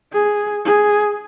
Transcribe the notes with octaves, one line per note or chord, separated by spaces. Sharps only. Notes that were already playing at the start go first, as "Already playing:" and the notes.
G#4
G#4